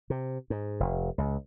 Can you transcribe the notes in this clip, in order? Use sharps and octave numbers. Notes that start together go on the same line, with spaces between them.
C3
G#2
F1
C#2